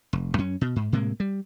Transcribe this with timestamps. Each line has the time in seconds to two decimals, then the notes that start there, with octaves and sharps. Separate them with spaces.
0.13 F1
0.38 F#2 C#4
0.61 B2
0.76 G#2
0.92 A2 C3 G#3 A#3
1.20 G3